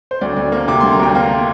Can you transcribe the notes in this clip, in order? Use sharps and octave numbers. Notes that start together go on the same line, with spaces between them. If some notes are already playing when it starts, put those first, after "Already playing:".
C5
D2 D5
D2
A#3
C3 D6
D2 C6
A#5
D2 G5
A#3 F5